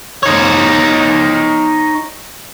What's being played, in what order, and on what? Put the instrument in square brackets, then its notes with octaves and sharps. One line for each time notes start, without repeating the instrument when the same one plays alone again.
[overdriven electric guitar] D#4 C#5